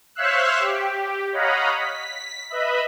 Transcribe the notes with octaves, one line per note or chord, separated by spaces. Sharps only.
C5 C#5 E5 F5 E6 F#6
G4
C#5 D#5 F5 F#5 A#5 B5
B6
B4 D#5 E5 B5